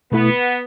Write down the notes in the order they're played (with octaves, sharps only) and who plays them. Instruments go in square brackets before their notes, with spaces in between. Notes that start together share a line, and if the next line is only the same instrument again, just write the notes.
[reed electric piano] B2 A3 E4 [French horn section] B3